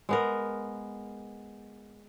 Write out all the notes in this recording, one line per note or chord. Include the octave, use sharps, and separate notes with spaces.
G#3 B3 A#4